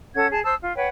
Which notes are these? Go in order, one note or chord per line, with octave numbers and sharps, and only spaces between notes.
C#4 A4 F#5 G#6
G#4 A5
C5 A5 D#6 E6
F4
B4 C#5 F#5 G5